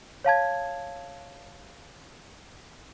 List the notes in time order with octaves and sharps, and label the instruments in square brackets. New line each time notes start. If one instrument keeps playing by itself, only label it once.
[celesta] C#5 F5 A5 G#6